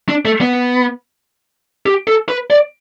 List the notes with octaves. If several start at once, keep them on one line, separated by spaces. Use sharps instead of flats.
D4
A3
B3
G4
A4
B4
D5